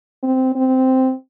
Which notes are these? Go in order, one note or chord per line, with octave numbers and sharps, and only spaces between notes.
C4
C4